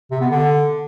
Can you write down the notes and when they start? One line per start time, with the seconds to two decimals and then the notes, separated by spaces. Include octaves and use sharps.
0.11 C3
0.21 B3
0.31 D3